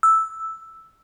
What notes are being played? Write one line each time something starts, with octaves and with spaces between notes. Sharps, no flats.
E6